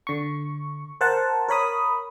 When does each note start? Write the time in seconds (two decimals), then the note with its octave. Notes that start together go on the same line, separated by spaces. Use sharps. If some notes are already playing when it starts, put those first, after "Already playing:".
0.07 D3 C#6
1.01 A#4 C5 F#5 A5
1.48 A#4 C#5 B5 D#6